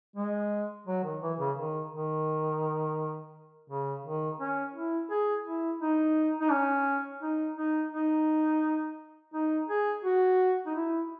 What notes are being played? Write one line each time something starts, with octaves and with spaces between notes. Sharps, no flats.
G#3
F#3
D#3
E3
C#3
D#3
D#3
C#3
D#3
C#4
E4
G#4
E4
D#4
D#4
C#4
D#4
D#4
D#4
D#4
G#4
F#4
D#4
E4